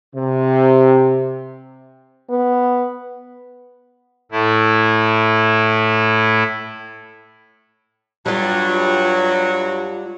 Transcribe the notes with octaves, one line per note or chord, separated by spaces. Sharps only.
C3
B3
A2 A3 E4
G2 F#3 G3 F4